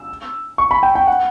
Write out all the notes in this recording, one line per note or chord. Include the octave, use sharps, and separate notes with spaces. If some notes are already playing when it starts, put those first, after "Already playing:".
Already playing: E6
C#6
B5
G5
G5
F#5